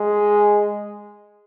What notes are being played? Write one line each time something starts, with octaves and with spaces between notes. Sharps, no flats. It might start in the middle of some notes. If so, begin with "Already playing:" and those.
Already playing: G#3